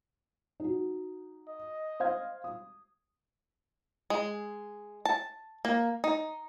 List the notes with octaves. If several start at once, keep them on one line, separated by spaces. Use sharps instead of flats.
D#4 F#4
D#5
C5 F5 G#6
D#6
G#3
A5
A#3
D#4